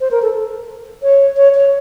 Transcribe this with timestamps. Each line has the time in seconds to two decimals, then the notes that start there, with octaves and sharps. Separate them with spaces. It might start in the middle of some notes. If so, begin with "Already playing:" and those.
0.01 C5
0.11 A#4
0.22 A4
1.03 C#5
1.37 C#5
1.55 C#5